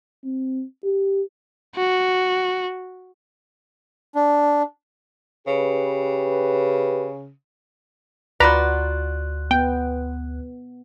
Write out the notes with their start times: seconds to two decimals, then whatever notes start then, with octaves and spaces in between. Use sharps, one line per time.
0.25 C4
0.85 G4
1.76 F#4
4.15 D4
5.47 C#3 G4 B4
8.40 D2 F4 F#4 B4 D5 A#5 B5 F#6
9.51 B3 G5